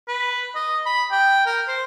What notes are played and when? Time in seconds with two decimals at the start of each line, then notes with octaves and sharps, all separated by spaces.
0.08 B4
0.55 D#5
0.86 B5
1.11 G5
1.46 A#4
1.68 C5